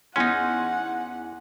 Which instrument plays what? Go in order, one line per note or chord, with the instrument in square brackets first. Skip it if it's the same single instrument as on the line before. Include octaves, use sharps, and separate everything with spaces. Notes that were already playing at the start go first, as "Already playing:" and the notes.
[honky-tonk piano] E2 G#5 C6 [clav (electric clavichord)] C#4 D#4 [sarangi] F#5